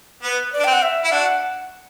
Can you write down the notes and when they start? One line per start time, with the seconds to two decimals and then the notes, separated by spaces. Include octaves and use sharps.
0.23 B3 B4
0.53 D5
0.59 D4
0.64 C4 G5
0.73 F#5
0.82 E5
1.04 E4
1.11 D4 F#4 F#5